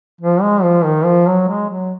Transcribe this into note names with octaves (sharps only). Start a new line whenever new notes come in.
F3
G#3
F3
D#3
F3
F#3
G#3
F#3